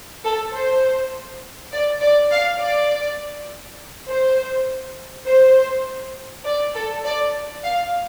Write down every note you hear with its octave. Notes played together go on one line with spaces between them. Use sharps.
A4
C5
D5
D5
F5
D5
C5
C5
D5
A4
D5
F5